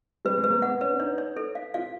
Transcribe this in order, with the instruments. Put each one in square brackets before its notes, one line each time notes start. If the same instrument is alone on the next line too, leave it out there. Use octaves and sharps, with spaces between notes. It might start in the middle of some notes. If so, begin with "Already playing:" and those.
[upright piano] G3 [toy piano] B4
[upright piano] G#3
[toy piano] B4
[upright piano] A#3
[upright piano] B3 [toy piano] F#5
[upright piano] C#4 [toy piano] B4
[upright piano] D4
[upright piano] D#4 [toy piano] C#5
[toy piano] C#5
A4
F5
[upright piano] F4 [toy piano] F5